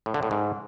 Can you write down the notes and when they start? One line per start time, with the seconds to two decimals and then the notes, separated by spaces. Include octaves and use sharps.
0.06 A2
0.14 D3
0.23 A2
0.31 G#2